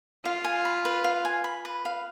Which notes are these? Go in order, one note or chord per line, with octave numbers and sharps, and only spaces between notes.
F4 F5
G#5
B5
B4
F5
G#5
B5
B4
F5